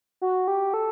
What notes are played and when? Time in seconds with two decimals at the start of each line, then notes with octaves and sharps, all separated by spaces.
0.21 F#4
0.48 G4
0.74 A4